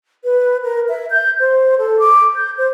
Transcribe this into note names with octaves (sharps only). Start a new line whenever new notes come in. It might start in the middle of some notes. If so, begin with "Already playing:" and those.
B4
A#4
E5
G6
C5
A4
D6
G6
C5